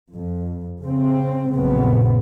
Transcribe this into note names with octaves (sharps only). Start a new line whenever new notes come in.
F2
C#3 C4
A#1 F#2 A#2 C#3 B3 C4